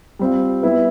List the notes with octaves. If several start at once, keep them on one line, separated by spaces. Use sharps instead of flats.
G3 C4 F4
G3 B3 E4